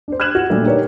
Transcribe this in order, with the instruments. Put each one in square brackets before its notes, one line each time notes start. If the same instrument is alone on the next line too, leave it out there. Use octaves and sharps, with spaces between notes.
[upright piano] D4 C5
F6 F#6 G#6 E7 F#7
F#4
A#2 D3 G3 A3
D#4 G4 A#4 B4 C#5 D5